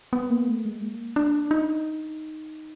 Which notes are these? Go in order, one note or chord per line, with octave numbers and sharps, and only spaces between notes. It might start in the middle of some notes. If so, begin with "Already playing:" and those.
B3
A#3
A3
G#3
A#3
D4
D#4